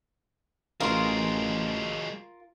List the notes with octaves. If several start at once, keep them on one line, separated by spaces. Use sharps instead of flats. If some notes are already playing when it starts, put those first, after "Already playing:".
A1 F#3 G#3 F4 A#4 F5 C6